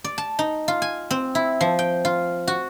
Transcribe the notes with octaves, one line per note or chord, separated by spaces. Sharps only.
D5
A5
D#4
F4
G#5
C4
E4
F3
G5
F4
F#4